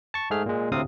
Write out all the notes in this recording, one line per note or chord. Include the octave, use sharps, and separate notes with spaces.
A5 C#6
G#2 A3 G#4 F6
A#2 G#3
D2 A2 C3 C4 F5 D#6